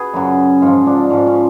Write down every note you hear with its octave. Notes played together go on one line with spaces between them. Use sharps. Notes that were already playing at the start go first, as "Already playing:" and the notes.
Already playing: F#4 G#4 B4
F#2 C#3 F#3
G#2 F3 F4
D4
G#2 F3 C#4
C#4